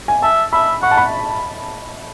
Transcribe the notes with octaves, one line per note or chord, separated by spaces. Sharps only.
G#5
E5 A5
E5 B5
F#5 C#6
A5
B5